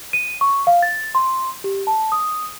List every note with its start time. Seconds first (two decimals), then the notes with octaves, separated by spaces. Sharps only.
0.13 D#7
0.41 C#6
0.67 F5
0.82 A6
1.15 C6
1.64 G4
1.87 A5
2.12 D#6